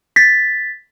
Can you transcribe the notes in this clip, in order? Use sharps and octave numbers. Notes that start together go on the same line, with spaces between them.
A6 B6